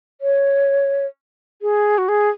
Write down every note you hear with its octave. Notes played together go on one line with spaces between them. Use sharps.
C#5
G#4
F#4
G#4